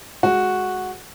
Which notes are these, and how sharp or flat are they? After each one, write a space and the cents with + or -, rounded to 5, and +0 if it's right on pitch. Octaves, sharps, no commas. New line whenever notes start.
G#3 +10 F#4 -5